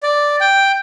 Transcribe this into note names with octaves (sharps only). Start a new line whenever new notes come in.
D5
G5